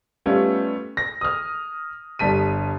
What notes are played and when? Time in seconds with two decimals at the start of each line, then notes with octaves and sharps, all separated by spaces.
0.26 G3 A3 B3 C#4 F4 G4
0.97 A#6
1.21 D#6 F6
2.19 G1 G3 A5 B6 D#7